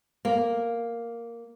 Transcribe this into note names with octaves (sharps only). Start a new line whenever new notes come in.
A#3